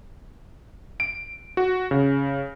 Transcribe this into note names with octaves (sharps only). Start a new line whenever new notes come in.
D7
F#4
C#3